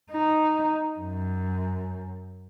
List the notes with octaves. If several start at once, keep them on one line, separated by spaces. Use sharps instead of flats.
D#4
F#2